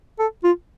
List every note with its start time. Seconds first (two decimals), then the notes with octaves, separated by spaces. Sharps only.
0.19 A4
0.44 F4